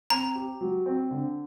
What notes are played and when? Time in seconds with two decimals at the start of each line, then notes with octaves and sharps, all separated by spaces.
0.10 C4 A#5
0.35 G4
0.61 F#3
0.86 C4
1.11 D3